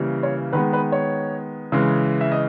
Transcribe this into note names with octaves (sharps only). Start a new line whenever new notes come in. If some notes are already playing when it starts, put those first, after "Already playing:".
Already playing: C#3 E3 G3 A#3
C#5
D#3 G#3 B3 B4
B4
C#5
C#3 E3 G#3
E5
D#5